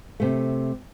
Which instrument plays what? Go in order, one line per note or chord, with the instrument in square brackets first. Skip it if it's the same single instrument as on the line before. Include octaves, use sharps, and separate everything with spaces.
[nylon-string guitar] C3 A3